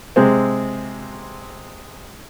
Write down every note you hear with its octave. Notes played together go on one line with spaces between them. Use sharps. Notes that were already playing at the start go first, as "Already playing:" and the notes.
C3 G#3 C4